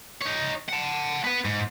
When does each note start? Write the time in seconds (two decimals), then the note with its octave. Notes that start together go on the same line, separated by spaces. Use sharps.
0.21 D#4 C#5
0.69 F#5 A5
1.24 B3 B4
1.45 G#2